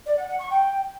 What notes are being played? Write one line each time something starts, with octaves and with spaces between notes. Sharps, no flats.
D5
F#5
F#5
C#6
G5